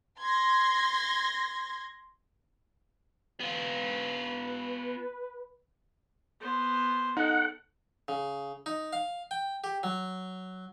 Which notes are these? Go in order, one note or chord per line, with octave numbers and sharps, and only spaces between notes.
C6 G#6 A#6
B3 F4 B4
B3 C5
D#4 A4 F#5
C#3
D#4
F5
G5
G4
F#3